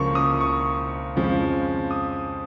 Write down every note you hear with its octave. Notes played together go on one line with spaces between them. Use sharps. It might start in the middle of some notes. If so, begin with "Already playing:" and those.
Already playing: C#2 C#3 F3 A#3 C#6
D#6
C#6
F2 C#3 F3 G#3
D#6